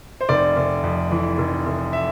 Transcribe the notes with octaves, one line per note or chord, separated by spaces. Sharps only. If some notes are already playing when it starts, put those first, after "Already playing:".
C5
F1 D5
F1
F2
E3
F1
F1
E5